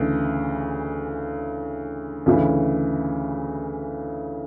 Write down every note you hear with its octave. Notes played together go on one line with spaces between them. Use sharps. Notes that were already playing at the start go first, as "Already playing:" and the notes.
Already playing: D2 C#3 E3
D2 C#3 E3